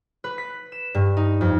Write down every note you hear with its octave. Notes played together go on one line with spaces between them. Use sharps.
B4
B6
E7
G2
D#4
F2